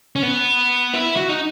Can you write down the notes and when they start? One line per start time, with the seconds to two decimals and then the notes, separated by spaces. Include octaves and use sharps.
0.16 C#4
0.23 B3
0.93 E4
1.16 F#4
1.29 D#4